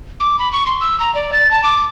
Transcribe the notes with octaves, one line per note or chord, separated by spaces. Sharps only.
D6
B5
C#6
C6
E6
A#5
D5
A6
A5
D6